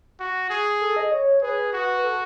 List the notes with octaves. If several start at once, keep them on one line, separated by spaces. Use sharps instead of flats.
F#4
G#4
A4
D#5
C#5
G#4 B4
F#4
A4